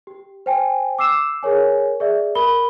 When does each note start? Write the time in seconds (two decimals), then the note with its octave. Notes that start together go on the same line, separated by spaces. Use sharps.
0.07 G4
0.46 C5 G5 G#5
0.99 D6 E6 C7 E7
1.43 G#4 A#4 C#5 G#5
2.00 G#4 D5 E5
2.35 A#4 B5 G7